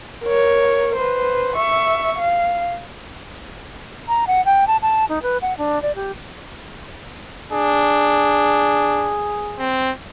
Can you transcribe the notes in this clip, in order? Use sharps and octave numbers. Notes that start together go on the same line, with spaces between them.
A#4 C#5
B4 C5
E5 C#6
F5
A#5
F#5
G5
A5
A5
D#4
B4
F#5
D4
D5
G4
D4 G#4
C4